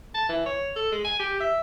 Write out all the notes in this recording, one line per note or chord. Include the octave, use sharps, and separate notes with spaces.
A5
E3
C#5
A4
G#3
G#5
G4
E5